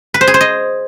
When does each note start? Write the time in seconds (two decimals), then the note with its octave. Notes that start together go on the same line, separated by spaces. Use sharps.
0.14 B4
0.21 C5
0.27 G#4
0.34 C5
0.41 D#5